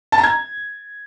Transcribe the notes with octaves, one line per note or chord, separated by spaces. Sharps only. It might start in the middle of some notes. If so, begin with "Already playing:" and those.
A5
A#5
G#6